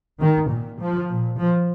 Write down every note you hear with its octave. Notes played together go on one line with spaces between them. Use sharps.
D#3
A#2
F3
A#2
F3